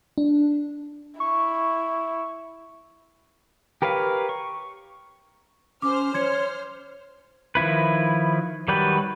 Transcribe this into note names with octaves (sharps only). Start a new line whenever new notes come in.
D4
E4 C#6
G4 A#4 B4 C#5 F5
C#6
C#4 C5 D6 F6
C#5 C6 G#6 C#7
D#3 F3 E4 B4
D#3 F#3 G3 G4 B4